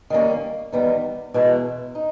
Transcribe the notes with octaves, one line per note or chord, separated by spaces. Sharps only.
D#3 G3 A#3 C#4
E2 D#3 G3 B3 D#4
E2 B2 G#3 B3 E4
D#4